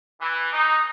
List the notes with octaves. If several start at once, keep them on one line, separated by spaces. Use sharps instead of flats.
E3
D#4